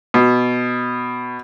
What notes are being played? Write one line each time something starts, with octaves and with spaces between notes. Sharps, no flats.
B2